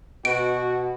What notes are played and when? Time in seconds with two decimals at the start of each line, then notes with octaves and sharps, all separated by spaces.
0.25 B2 F#4 D7